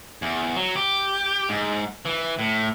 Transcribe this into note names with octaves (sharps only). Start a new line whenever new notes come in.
E2
F#3
G4
G#2
E3
A2